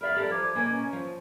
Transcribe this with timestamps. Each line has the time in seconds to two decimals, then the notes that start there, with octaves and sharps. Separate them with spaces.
0.01 A#4 D5 E5 F5 B5 F6
0.16 G4 A4 A#4
0.30 F3 D6 G#6
0.55 B2 A#3 G#5
0.70 C#4
0.93 F3